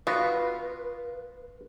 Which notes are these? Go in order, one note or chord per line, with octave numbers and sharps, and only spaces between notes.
B3 F4 F#4 B4